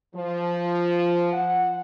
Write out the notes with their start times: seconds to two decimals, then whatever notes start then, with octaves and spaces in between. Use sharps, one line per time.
0.15 F3
1.34 F#5